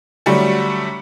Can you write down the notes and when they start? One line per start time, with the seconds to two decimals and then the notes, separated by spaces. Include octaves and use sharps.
0.26 D3 F#3 G3 A3